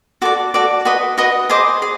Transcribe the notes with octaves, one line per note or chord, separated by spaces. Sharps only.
F#4 A4 D5 D6
F#4 A4 D5
F#4 B4 D#5
F#4 B4 D#5 D#6
G#4 C5 D#5 D6
G#4